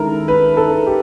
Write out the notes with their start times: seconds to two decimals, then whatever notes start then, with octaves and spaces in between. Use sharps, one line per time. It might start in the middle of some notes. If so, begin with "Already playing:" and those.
Already playing: D#3 G#3 C#4 E4 A4 A#4
0.28 B4
0.57 A4
0.86 G4